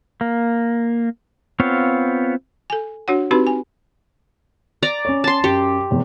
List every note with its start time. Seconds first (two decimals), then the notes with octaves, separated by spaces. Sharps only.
0.21 A#3
1.60 B3 C4 F4 C#5 F5
2.70 A4 G#5
3.08 D4 F#4 C#5 F#5
3.31 C4 D#4 F#4 G4 B4 B5
3.47 G#5
4.82 D5 A#5
5.05 C#4 C#5
5.24 A5 C6
5.44 F#2 G4
5.91 F1 E2